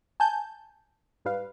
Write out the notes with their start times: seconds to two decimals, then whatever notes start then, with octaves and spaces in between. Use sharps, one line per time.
0.20 G#5 A5 G6
1.25 G#2 G3 B4 F5